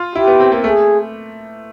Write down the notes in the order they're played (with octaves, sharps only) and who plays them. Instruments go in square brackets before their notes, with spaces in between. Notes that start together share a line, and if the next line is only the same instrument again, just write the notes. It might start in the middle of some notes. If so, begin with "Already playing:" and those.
Already playing: [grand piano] F4
[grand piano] E4 [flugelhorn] G4
[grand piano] B3
C4
A#3
[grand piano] A3 [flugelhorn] G#4